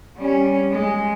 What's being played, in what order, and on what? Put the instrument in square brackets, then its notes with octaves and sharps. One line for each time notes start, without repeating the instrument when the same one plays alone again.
[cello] G3 C#4
G#3